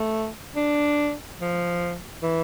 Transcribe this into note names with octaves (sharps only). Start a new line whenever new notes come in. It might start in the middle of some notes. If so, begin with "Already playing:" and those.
Already playing: A3
D4
F3
E3